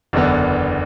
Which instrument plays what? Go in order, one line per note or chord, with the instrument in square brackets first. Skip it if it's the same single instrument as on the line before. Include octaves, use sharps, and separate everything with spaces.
[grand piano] F#1 E2 D3 B3